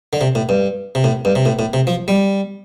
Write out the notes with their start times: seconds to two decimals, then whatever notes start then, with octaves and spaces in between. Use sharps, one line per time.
0.13 D3
0.21 C3
0.35 A2
0.49 G2
0.95 C3
1.04 A2
1.25 G2
1.35 C3
1.46 A2
1.59 A2
1.73 C3
1.87 F3
2.08 G3